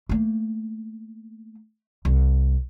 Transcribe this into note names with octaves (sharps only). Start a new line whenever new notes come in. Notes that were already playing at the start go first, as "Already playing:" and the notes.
A3 A#3
C2